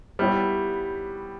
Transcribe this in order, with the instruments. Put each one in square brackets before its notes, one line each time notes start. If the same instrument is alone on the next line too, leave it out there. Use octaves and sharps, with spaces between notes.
[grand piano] G3 [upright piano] B3 E4 G4 C#5